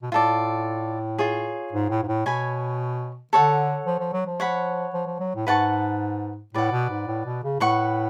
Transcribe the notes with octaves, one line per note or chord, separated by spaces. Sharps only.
B2
A2 F4 A4 D5
F4 G#4 C#5
G#2
A2
G#2
A2
B2 C#5 G#5 B5
D3 A4 C#5 F#5
F3
F3
F#3
F3
C#5 F#5 B5
F3
F3
F#3
A2
G#2 B4 F#5 A5 C#6
A2 B4 D5 F#5
B2
G#2
A2
B2
C#3
A2 B4 F#5 C#6